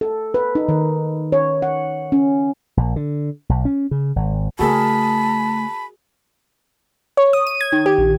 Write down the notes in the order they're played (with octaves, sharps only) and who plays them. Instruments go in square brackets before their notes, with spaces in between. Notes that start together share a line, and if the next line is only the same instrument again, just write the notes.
[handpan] A4
B4
D#4
D#3
C#5
F#5
C#4
[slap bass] A#1
D3
B1
C#4
C#3
G#1
[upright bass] C#3 A3 [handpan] F#4 G#4 A#4 [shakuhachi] A5 [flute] B5
[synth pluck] C#5
D#6
D#7
G#6
D#3
G4
A#1